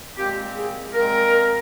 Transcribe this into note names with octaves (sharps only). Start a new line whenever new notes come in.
A#2 G#3 C4 G4
G#4
A#2 G#3 C4 A#4